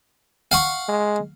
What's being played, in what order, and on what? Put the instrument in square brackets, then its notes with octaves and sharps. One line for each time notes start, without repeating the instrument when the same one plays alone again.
[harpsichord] F5 F#5 C#6
[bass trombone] G#3